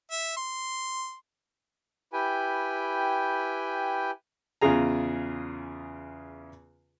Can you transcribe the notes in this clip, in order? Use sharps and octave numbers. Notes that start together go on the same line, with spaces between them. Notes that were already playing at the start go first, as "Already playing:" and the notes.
E5
C6
E4 G4 B4 G5 G#5
E2 C#3 F4 G#4 A#5